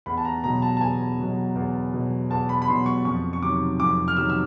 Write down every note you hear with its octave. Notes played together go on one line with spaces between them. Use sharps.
E2 B5
A5
A#5
B2 F#3 A#5
A5
A5
E2 G#5
B2 F#3
E2
B2 F#3
E2 A5
B5
B5
B2 F#3 C6
C#6
F2 C#6
C#6
C3 D#3 F#3 D6
F2 D6
F6
C3 D#3 F#3 E6
E6